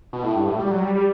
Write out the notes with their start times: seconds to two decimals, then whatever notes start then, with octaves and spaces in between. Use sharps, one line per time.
0.13 B2
0.24 A2
0.36 G2
0.48 A2
0.59 G3
0.71 F#3
0.83 G3
0.95 G3